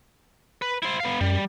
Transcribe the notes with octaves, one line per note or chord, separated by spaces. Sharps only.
B4
E4 C5
B3 F5
F#2 G3